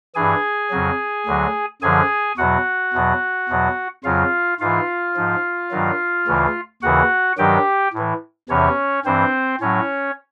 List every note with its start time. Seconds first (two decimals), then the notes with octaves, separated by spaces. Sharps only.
0.15 G2 E3 G#4 G#5
0.71 F2 C#3 F#3
1.26 D2 D3 F#3
1.82 F#2 D3 F3 G#4 G#5
2.37 E2 B2 F#3 F#4 F#5
2.93 E2 B2 F#3
3.49 E2 B2 F#3
4.04 F2 C#3 F#3 F4 F5
4.60 G#2 E3 F4 F5
5.16 G#2 F3
5.71 G2 D#3 F#3
6.27 D2 C#3 E3
6.82 D#2 C#3 E3 F#4 F#5
7.38 G2 D#3 F#3 G4 G5
7.93 A2 E3
8.49 E2 C3 E3 C#4 C#5
9.05 G2 E3 C4 C5
9.61 A2 F#3 C#4 C#5